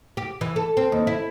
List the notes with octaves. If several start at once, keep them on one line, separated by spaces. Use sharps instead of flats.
G4
E3
A4
C4
D#2
E4